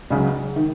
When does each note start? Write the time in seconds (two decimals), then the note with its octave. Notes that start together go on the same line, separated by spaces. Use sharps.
0.10 C#2 C#3 F#3
0.56 D#3